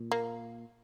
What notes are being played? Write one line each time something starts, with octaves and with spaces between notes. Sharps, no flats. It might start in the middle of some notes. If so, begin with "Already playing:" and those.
Already playing: A#2
A#3